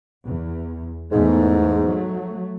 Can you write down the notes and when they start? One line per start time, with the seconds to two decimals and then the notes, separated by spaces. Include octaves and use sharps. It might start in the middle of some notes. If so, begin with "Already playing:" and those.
0.24 E2
1.12 E2 G#2 A3
1.87 F#3 A3